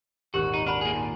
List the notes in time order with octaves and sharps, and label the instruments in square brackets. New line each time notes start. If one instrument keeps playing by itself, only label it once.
[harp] D#1 G#1 [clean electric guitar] F#4 [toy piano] G4 A#4 C5
[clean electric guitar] D#4
[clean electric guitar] D4 [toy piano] B4 F#5 B5
[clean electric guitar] A#3 G#4 [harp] G#5 F6
[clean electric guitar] A#2 [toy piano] D#4